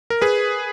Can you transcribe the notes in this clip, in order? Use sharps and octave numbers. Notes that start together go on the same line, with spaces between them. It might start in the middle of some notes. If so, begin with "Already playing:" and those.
A#4
G#4 B4